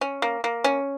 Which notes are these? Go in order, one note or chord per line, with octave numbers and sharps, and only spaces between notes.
C#4
A#3
A#3
C#4